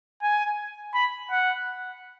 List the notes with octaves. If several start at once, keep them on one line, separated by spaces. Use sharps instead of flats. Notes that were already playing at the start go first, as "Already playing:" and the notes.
G#5
B5
F#5